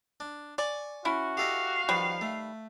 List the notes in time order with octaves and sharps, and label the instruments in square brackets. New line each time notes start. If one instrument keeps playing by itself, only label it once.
[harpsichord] D4
[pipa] D5 [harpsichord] G#5 C#6
[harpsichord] C#4 [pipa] E4 [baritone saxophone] F#4
[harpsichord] G4 A4 D#5 [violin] F5
[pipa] D#3 G3 B4 [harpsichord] F3
[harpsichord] A3